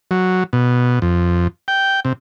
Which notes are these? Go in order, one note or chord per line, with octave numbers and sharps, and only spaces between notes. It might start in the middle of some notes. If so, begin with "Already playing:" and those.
F#3
B2
F2
G5
C3